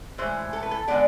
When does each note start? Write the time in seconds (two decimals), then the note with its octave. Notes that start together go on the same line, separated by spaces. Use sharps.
0.18 A2 E3 G#3 C5
0.53 A4
0.63 B4
0.71 A4
0.88 D3 G#3 B3 D5